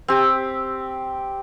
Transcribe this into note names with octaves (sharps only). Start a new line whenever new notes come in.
C4 G4